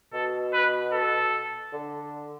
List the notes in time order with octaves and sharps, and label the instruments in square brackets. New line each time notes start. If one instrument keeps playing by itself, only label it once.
[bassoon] B2 [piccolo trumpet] A4
[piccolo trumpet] B4
A4
[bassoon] D3